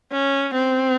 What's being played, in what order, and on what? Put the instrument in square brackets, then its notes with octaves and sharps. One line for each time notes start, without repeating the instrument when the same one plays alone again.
[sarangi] C#4
C4